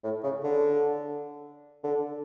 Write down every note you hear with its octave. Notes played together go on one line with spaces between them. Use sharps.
A2
C#3
D3
D3